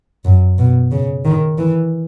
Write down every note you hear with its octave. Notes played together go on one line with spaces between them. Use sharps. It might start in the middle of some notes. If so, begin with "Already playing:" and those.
F#2
B2
C#3
D#3
E3